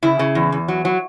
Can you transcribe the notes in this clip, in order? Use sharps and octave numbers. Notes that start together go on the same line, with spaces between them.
C#3 E4
C#3
E2
E2
F#3
F#3